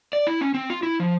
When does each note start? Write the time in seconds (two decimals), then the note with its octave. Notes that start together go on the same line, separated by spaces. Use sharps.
0.13 D5
0.27 E4
0.41 C#4
0.54 C4
0.70 F4
0.83 E4
1.00 F3